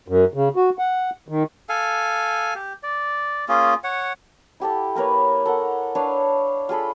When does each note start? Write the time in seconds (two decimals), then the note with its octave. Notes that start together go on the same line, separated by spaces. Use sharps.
0.08 F#2
0.34 C#3
0.56 F#4
0.79 F#5
1.28 D#3
1.69 A4 F5 G#5
2.55 G4
2.83 D5
3.49 A#3 C#4 F4 G#4
3.84 C#5 F#5
4.60 E4 G4 A4 A5
4.95 A#3 A#4 B4 C#5
5.46 A4 A#4 F#5
5.95 D4 B4 C#5 F5
6.69 F4 G#4 A4 B5